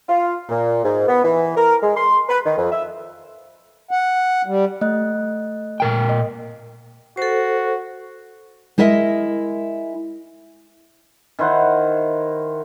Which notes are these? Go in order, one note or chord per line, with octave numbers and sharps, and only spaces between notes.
F4
A#2
G#2
B3
E3
A#4
G#3
C6
B4
D#3
F2
E5
F#5
G3
A3 D#5 F#6
A#2 A#4 G5
D#5
F#4 A4 C5
G#3 E4 A#4 D#5 E5
D#3 E4 C5 F#5